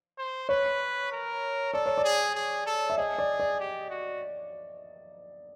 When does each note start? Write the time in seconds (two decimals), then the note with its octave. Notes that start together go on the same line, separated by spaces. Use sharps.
0.18 C5
0.49 B4 C#5
1.12 A#4
1.73 A4 D5
1.86 C#5
1.98 D5
2.04 G#4
2.35 G#4
2.66 A4
2.90 E5
2.97 G#4 D#5
3.18 D5
3.40 D5
3.60 G4
3.90 F#4